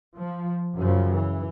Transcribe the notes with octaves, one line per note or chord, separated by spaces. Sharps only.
F3
F#2 C#3 F3
E3